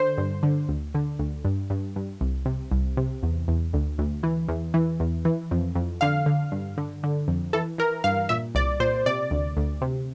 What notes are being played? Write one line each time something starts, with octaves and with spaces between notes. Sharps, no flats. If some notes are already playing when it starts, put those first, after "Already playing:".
Already playing: D3 C5
G2
D3
D2
D3
D2
G2
G2
G2
C2
C3
C2
C3
E2
E2
D2
D2
E3
E2
E3
E2
E3
F2
F2
D3 F5
D3
G2
D3
D3
F2
E3 A4
E3 A#4
G2 F5
A#2 E5
C2 D5
A#2 C5
C3 D5
D2
D2
C3